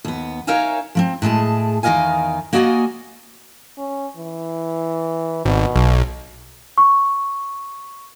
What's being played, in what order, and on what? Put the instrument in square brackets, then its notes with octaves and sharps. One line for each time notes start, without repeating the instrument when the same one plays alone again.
[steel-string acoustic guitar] D#2 B3
D#4 A#4 C#5 E5 F5 G#5
F3 A#3 C4
A2 G#3 G#4 A5
E2 D#3 G4 D#5 F5 G#5
A#3 F#4 D5 D#5 F#5 G#5
[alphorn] C#4
E3
[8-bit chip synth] G#1 [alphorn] B2
[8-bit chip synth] B1
[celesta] C#6